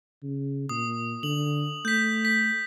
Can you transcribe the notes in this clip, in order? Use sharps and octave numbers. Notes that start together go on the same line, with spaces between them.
C#3
A#2 D#6
D3 F#7
A3 G6 B6
B6